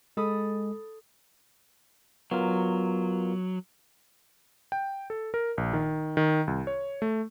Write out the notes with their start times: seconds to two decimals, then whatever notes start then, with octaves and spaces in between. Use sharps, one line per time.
0.17 G#3 A4 B5 D#6
2.31 F#3 B3 F4 A#4
4.72 G5
5.10 A4
5.34 A#4
5.58 A#1
5.73 D#3
6.17 D#3
6.47 C2
6.67 C#5
7.02 A3